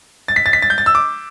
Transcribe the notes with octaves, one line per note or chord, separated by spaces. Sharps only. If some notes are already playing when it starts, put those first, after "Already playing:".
A6
B6
A6
B6
A6
G6
A6
E6
D6